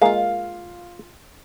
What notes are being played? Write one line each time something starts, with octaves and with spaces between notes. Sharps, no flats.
G#3 A#3 F4 F5